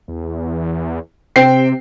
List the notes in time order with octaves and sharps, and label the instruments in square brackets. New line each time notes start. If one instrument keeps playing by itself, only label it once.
[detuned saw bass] E2
[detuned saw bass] C3 [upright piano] C4 G5 C7